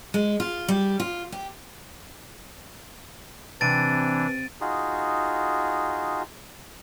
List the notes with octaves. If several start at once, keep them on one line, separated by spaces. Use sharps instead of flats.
G#3
F4
G3
F4
G4
C3 E3 D4 A6 D7 D#7
D#4 F4 F#4 G#4